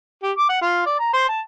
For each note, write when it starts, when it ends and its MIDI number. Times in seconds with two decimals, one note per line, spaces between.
0.23 0.32 67
0.37 0.46 86
0.49 0.61 78
0.62 0.85 65
0.86 0.98 74
0.99 1.13 82
1.13 1.28 72
1.29 1.41 81